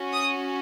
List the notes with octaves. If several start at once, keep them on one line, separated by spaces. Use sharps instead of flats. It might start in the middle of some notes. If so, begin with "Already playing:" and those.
Already playing: C#4 F#4
D#6